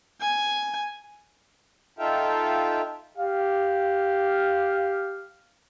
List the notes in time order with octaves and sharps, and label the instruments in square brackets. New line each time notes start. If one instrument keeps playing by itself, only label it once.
[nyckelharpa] G#5
[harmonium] D#4 F4 A4 E5 F5 G5
[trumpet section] G4 F5